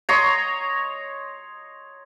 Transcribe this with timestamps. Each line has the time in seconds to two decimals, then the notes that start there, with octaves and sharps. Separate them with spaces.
0.09 C#5 D#5 A#5 C6